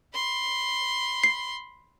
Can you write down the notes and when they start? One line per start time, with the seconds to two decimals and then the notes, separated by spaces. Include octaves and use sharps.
0.15 B5 C6
1.24 C7